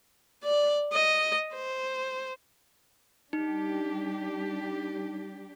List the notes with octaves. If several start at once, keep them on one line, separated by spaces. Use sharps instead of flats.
D5
D#5
C5
G3 D4 D#4 G4